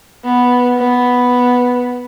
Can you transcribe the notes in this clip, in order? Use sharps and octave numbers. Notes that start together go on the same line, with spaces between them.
B3
B3